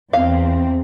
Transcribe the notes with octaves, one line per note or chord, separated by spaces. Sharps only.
E2 C4 F5